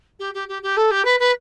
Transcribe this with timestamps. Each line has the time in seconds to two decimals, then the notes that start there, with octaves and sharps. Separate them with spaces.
0.19 G4
0.34 G4
0.48 G4
0.62 G4
0.77 A4
0.91 G4
1.05 B4
1.19 B4